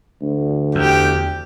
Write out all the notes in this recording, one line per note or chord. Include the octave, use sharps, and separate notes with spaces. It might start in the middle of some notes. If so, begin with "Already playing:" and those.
D2
E2 G4